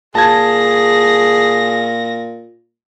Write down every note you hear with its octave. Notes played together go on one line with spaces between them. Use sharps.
A#2 G#4 A5 G#6 A#6